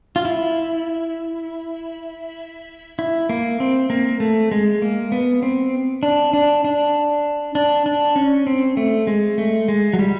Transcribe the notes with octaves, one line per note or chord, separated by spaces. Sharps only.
F4
E4
E4
A#3
C4
A#3
A3
G#3
A#3
B3
C4
D4
D4
D4
D4
D4
C#4
C4
A3
G#3
A3
G#3
F#3
G3